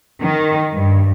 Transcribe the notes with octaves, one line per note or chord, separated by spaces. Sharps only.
D#3
G2